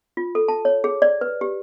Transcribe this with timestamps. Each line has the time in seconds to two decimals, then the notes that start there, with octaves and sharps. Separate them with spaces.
0.17 F4
0.35 A4
0.48 A5
0.65 C#5
0.84 G#4
1.02 D5
1.21 B4
1.41 G4